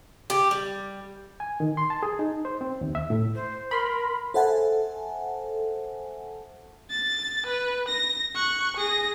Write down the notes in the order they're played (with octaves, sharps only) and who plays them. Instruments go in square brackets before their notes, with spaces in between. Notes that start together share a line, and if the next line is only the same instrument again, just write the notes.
[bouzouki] G4
G3
[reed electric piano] G#5
D#3
C6
A5
G#4
D#4
C5
C4
D#2
E5
A2
[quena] C5
[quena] A#4 [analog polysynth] B5 C6
[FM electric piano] A4 C5 E5 F#5 G#5 A5
[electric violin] A6
B4
A#6
C#6 F#6
G#4 A#6